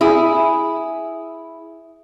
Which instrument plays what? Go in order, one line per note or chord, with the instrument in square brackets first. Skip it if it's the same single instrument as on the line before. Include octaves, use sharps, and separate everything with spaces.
[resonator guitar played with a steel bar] E4 G#4